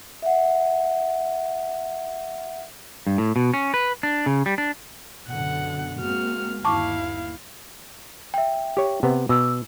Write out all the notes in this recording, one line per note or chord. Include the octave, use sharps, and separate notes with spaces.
E5 F#5
G2
A2
B2
C#4
B4
D4
C#3
G3
D4
F#2 B2 D3 F#5
G#3 A#3 C4 F#4 F6
G1 D#2 E4 F5 A5 C#6 D6
E5 G5
G4 C#5
C3 B3
B2 D6 E6